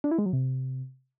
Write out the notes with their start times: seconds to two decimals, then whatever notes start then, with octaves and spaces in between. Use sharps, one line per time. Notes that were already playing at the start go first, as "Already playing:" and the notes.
0.04 D4
0.11 E4
0.19 G#3
0.26 F#3
0.33 C3